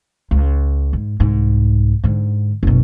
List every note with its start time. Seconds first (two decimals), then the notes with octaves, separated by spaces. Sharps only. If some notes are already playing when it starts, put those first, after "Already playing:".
0.31 C#2
0.93 G#2
1.20 C2 G#2
2.04 G#2 D3
2.63 F#1 B2